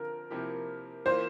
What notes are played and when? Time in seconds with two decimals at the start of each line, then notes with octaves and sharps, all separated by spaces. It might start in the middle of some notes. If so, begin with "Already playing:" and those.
Already playing: D3 F3 C4 F4 A#4
0.31 C3 F3 A#3 E4 G4
1.05 E3 A#3 F4 C5